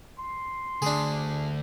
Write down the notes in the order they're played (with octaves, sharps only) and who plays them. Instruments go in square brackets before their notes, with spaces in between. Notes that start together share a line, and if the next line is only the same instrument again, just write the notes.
[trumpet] C6
[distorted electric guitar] D2 [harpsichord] D4 G#4